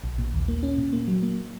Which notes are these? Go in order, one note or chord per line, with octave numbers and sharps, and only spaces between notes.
A#1
A#2
D#2
A#3
C#4
A#2
A#3
F#3
A#3